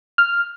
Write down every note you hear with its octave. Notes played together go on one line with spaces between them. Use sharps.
F6